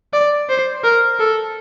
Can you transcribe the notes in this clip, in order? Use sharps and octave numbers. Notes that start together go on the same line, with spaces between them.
D5
C5
A#4
A4